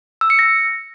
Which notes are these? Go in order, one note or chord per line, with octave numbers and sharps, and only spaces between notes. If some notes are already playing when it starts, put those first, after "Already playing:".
E6
C#7
A#6